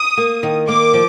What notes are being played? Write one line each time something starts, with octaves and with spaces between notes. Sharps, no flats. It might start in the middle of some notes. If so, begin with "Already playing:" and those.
Already playing: D#6
A#3
D#3
A#3 D6
F3